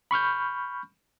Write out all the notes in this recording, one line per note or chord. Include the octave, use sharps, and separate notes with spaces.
B5 C#6 F6 G6